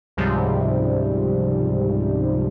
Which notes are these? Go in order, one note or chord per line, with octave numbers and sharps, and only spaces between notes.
C#2 G#2 C3 F3 G3